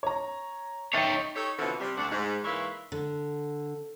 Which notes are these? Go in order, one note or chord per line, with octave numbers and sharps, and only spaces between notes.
C#5 A#5
D#4 C#5 E5 G5 A6
D#4 G4 A4 C#5
B2 D3 E3 F3 C4 C#4
C3 G3
D2 D4 F#5
G#2
G#2 E3 A#3 B4 C#5 E5
D3